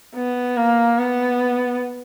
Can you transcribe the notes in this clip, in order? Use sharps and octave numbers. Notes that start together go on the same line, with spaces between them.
B3
A#3
B3